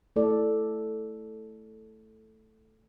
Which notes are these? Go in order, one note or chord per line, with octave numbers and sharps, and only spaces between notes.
A3 E4 A4 D5